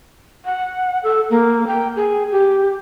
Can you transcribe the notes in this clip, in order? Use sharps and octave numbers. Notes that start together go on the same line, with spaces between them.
F#5
A4
A#3
G5
G#4
G4